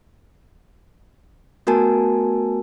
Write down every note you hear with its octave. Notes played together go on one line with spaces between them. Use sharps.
A3 B3 F#4 A#4 G#5 A5